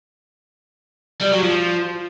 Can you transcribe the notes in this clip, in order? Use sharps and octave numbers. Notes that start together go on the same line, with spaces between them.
G3
F#3
F3